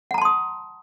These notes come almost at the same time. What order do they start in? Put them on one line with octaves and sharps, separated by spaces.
F#5 A#5 A5 C6 D#6